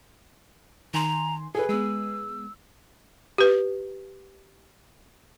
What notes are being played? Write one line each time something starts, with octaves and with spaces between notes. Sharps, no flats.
D#3 G#5 A#5 C6
G#4 A4 B4
G#3 B3 E6
G4 B4